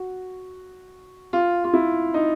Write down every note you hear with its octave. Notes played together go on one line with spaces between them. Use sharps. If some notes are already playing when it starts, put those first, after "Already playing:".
Already playing: F#4
F4
F4
E4
D#4